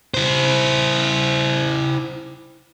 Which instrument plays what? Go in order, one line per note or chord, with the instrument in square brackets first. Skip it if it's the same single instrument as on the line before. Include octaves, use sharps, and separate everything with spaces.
[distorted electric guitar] E4 C5